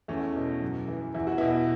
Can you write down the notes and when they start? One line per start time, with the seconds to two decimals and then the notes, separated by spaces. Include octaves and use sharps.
0.08 E2 A3 C#4
0.36 B2
0.62 F#2
0.88 E3
1.14 E2 E4
1.27 F#4
1.38 B2 B3 E4